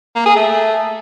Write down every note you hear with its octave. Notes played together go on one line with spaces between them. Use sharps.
A#3
G#4
A3